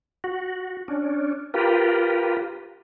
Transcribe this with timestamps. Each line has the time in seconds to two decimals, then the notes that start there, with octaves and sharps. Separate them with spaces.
0.24 F#4
0.88 C#4 D4
1.54 F4 G4 A#4 B4